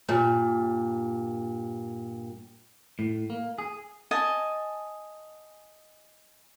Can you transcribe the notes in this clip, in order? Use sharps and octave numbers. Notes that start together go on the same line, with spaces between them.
G2 A#2
A2
A#3
G#4
D#5 G#5 A5